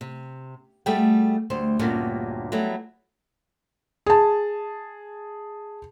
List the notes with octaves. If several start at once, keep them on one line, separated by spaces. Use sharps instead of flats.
C3
G3 A3 F#4 G#4 G5
D2 G3 C5
D2 G2 A#2 B3 C#4 G4
F#3 G3 A3 B3 E4
G#4 A5